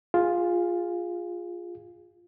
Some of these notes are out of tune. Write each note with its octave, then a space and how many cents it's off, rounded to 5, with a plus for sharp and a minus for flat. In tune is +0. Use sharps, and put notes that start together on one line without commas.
F4 +5 G#4 -15